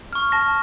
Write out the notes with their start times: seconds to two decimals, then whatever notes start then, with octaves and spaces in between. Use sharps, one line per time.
0.13 C#6 F6
0.32 A5 A#6